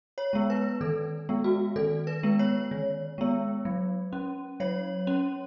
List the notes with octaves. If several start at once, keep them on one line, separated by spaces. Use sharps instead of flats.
C#5
G#3 B3
B4
D#3 A4
G#3 B3
F#4
D#3 A4
B4
G#3 B3
C#5
D#3
G#3 B3
F#3
C#4
F#3 C#5
C#4